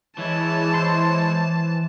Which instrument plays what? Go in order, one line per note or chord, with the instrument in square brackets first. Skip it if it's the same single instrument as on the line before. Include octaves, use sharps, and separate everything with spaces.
[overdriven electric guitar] E3 [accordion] G#3 E4 C#5 [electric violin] A5
[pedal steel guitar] C5 C6